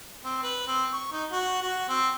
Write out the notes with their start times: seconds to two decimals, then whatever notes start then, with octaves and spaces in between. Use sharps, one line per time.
0.24 C4
0.43 B4
0.67 C4
0.93 C#6
1.12 D#4
1.31 F#4
1.62 F#4
1.89 C4